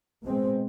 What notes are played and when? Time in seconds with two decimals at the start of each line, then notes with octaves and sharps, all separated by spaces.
0.23 B2 G#3 C4